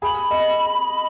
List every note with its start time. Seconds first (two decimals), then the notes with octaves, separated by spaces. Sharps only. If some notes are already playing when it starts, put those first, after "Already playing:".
0.02 G#4 B5
0.31 D#5